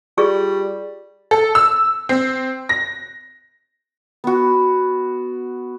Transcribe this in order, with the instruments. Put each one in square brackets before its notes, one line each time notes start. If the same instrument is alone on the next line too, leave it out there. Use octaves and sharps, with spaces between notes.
[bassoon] G3 [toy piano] F4 G#4 C#6
[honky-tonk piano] A4
E6
C4
A#6
[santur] B3 F#4